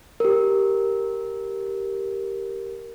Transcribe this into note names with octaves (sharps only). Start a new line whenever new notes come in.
G4 A#4